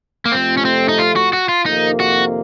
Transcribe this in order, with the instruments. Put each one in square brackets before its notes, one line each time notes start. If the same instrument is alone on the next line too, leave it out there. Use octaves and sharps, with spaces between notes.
[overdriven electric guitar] A#3
[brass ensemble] F2 C3 F3 A3 [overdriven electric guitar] C4
[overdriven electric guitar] C#4
C4
D#4
F4
F#4
F#4
F4
[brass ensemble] F2 C3 D#3 A#3 [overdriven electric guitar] D#4
[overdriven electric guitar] F#4